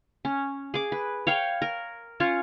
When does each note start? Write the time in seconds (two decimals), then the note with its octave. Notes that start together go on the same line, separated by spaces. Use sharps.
0.25 C#4
0.74 G#4 D6
0.92 B4
1.27 C#5 F5 G5
1.62 A#4
2.20 C#4 F4 C#5